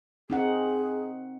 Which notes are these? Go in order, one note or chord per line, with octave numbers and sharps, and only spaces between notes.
C4 D#4 G#4 F#5